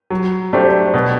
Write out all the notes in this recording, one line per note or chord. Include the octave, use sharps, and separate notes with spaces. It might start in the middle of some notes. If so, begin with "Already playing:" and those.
F#3
A3 D4 G4 C5
B2